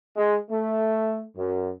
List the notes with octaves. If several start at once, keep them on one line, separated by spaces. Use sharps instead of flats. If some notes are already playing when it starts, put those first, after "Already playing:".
G#3
A3
F#2